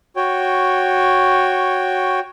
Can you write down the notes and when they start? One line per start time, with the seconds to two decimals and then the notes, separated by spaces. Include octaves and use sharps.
0.16 F#4 C#5 G5